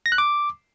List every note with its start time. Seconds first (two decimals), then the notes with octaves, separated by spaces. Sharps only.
0.06 A#6
0.12 F#6
0.18 D6